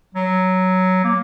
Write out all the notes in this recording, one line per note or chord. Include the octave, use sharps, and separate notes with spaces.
F#3
A#3